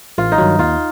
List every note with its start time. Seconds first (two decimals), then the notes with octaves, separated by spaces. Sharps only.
0.18 A1 F4
0.32 D#4
0.38 G2 D#3 F#3
0.59 D#2 F4